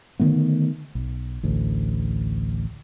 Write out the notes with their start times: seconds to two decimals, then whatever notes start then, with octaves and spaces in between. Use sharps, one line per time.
0.20 D3 D#3 A3 B3
0.95 B1
1.43 A1 D2